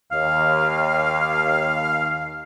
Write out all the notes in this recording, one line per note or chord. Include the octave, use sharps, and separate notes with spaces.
D#2 F5